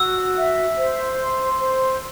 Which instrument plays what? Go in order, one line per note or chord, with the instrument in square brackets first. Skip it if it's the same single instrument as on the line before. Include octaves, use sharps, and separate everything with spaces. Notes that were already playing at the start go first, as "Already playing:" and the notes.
Already playing: [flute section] F#4 [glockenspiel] E6
[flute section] E5
C5
C6
C5